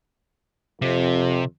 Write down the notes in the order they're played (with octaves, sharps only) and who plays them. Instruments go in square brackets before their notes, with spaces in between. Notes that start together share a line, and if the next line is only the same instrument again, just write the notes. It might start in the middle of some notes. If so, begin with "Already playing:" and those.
[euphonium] F2 [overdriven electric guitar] C3